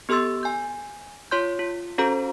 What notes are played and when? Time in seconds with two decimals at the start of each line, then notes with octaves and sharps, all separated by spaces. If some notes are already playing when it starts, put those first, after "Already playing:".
0.09 B3 G4 A4 C6 E6 A6
0.43 G#5 G6
1.31 F4 C#5 C6 G6
1.59 F4
1.98 C#4 F#4 A4 C5 A#5